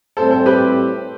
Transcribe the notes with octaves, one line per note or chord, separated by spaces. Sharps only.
A2 G3 C4 E4 A4 C5
A4 C5
G4 B4